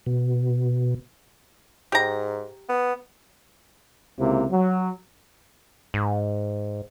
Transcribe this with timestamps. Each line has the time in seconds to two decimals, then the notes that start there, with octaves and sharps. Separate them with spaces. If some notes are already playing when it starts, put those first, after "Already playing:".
0.06 B2
1.92 G#2 G4 A#5
2.69 B3
4.19 C#2 C3 A#3 E4
4.51 F#3
5.94 G#2